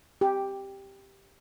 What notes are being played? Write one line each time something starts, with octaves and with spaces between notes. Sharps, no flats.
G4